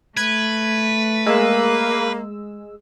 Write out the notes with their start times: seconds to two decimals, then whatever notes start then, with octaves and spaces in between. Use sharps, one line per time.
0.17 A3 B4 G#6
1.26 G#3 A#3 E6